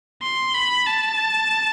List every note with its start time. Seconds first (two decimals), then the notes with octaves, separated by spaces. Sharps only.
0.23 C6
0.54 B5
0.87 A5